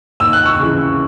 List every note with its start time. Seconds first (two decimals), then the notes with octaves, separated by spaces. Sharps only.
0.20 D#2 E6
0.33 F#6
0.45 C#6 E6
0.60 C#3 E3